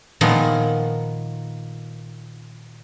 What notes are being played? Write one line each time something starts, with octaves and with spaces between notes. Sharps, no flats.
A#2 D#3 F3 G#3 B3